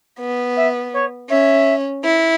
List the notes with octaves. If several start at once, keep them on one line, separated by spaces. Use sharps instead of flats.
B3
E5
C#5
C#4 E5
E4